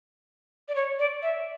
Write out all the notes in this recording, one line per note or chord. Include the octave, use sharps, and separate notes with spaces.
D5
C#5
D5
E5